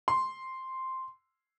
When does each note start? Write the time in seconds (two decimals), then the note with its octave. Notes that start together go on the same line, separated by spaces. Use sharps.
0.08 C6